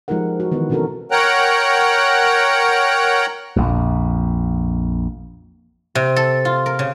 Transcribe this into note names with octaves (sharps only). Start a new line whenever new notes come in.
F3 G#3 D#4 G4 A#4 F#5
F#4
D#3 E3 B3
B2 C4 C#4 F#4 A4 A#4
A#4 C#5 F#5 G5 A#5 F#6
A#1 F2
C3
A4
F4
A#4
C#3